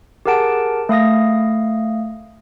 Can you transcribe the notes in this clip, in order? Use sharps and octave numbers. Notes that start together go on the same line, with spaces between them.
G4 G#4 A#4 F#5 A5 D7
A3 F5 D#6 A#6